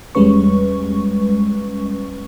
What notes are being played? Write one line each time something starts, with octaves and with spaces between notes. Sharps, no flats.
E2 G3 G#3 C#4 B4 C#6